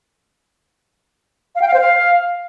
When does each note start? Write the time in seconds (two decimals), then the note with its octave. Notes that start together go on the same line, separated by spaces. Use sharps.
1.55 F5
1.62 G5
1.68 F5
1.74 C5
1.80 F5